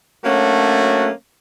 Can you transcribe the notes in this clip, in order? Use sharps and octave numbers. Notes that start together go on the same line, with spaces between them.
F#3 A3 A#3 C#4 D4 F#4